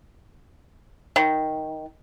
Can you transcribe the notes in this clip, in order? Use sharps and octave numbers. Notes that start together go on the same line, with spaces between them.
D#3